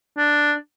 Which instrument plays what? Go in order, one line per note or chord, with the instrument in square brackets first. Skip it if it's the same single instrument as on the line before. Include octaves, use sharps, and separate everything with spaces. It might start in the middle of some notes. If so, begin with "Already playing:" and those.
[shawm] D4